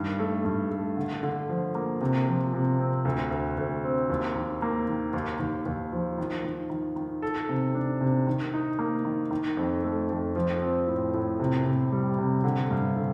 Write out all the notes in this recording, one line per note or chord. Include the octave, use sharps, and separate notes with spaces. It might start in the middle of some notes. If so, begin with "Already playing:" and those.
Already playing: G2 D#3
A3
G2
A3
D3
D3
F3
A#3
C3
F3
C3
C4
D2
D2
D2
C4
D#2
D#3
A#3
D#3
D#2
D#2
D#2
F3
D#3
D#3
D#3
D#3
A4
C3
D4
C3
D#3
D#4
A#3
D#3
D#3
F2
A3
F2
F3
C4
A2
A2
C3
C3
G3
C3
D3
G2
D3